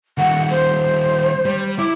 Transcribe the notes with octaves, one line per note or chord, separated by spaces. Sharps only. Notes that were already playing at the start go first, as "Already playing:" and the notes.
D#3 G3 F#5
C5
G3
E4 D6